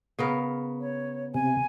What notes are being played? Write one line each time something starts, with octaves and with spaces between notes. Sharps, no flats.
C#3 B3 A#4
C#5
C3 G#5